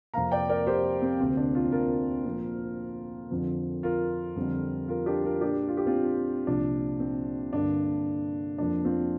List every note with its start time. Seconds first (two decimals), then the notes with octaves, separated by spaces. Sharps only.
0.14 F2 C3 A#3 F5 A#5
0.32 D5 G5
0.49 A#4 D5
0.67 G4 C5
1.02 C4
1.19 D2 C3 A#3 C4
1.37 D4
1.55 C4 F4
1.72 F4 A#4
2.25 A#2 F3 C4
3.30 F2 D3 F3 C4
3.83 F4 A#4
4.36 F2 D3 G3 C4
4.88 F4 A#4
5.06 D4 G4
5.24 F4 A#4
5.41 A#2 A#3 D4 G4
5.68 F4
5.77 G4
5.86 C4 F4
6.47 C2 A#2 F3 D4
7.00 C4
7.53 G2 D3 A#3 D4
8.58 F2 F3 A#3 D4
8.85 C4 F4